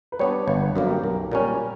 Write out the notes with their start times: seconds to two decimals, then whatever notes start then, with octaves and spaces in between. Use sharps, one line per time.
0.12 B4
0.19 G3 B3 D4 C#5
0.47 G1 C#5
0.62 B4
0.76 F#2 D3 A#3 A#4
0.90 G4
1.04 B1 A#4
1.32 A#2 G3 C#4 A#4